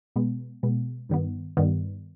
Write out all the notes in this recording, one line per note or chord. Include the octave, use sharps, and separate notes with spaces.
B2 G#3 B3
B2 G#3 B3
G2 D#3 G3 B3
G2 D#3 G3 B3